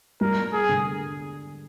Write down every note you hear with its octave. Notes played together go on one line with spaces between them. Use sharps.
G3 A#4
G#4
D3